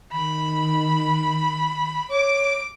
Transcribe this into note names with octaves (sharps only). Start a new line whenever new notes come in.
D#3 B5
C#5 D6